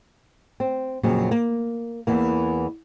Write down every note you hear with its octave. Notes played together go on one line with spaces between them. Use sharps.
C4
F2 A#2 C#3 F3 F#3
A#3
E2 E3 A#3